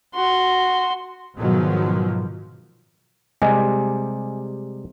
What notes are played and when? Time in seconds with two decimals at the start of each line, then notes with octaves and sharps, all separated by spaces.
0.15 F#4 C6
1.37 G#2 B2 D#3 F3 F#3
3.42 C3 G3 G#3 D#5 G#5